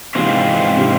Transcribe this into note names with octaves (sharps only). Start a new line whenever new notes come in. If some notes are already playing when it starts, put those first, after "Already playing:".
G#2 C3 E3 G#3 C4 F4
C3 E3